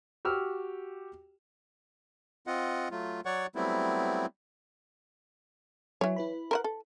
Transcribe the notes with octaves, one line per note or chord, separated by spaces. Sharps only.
F#4 G4 E6 F6
C4 F4 D#5 F#5
F#3 A3 F4
F#3 C#5 D5 F#5 C#6
F#3 G3 A3 B3 C4 E4
E3 F#3 C#5
E4 B4 B5
A#4 C5 F#5
A4